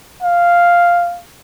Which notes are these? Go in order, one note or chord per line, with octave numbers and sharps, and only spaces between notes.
F5